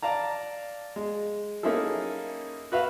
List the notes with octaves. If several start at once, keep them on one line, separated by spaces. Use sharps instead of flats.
D5 F5 A5 A#5
G#3
A#3 C#4 D#4 E4 G#4 A4
F#4 B4 E5 F5